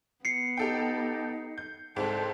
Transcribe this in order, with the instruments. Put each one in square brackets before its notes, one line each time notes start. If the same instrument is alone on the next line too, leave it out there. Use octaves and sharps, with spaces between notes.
[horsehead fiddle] B3 [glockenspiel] C7 C#7
[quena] D#4 [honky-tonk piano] G4 A4 G5
[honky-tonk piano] G6
[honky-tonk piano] C2 G#2 [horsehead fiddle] A4 G5 [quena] C5